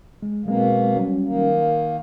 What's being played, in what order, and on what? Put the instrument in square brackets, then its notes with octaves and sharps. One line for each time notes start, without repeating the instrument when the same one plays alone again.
[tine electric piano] G#3
[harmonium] B2 A#3 [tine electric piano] F#3 G#3 C4
[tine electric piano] F#3 G3 C#4
[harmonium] D#3 A#3
[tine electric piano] F5